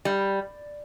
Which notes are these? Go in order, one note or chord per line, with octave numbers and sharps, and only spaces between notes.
G3